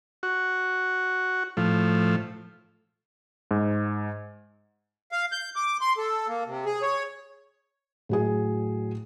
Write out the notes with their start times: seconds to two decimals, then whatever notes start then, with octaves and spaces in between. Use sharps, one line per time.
0.23 F#4
1.57 A2 F3
3.51 G#2
5.12 F5
5.32 G6
5.56 D6
5.81 C6
5.98 A4
6.28 A#3
6.47 C3
6.65 G#4
6.82 C#5
8.09 A2 F#3 G#4